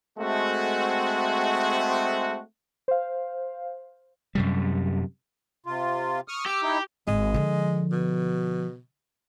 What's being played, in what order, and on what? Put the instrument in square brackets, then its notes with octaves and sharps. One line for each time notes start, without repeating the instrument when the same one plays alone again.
[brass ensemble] G#3 A3 C4 F#4
[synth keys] C5 F5
[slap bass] F#2 C3 G3
[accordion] C3 F4
C#6 D#6 F6
[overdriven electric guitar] G4 [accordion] D6 E6
[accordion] D#4 E4
[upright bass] G#1 [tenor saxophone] G#3
[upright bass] D3 F3
[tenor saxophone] B2